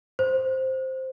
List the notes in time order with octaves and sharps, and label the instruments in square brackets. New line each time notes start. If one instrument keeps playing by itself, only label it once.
[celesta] C5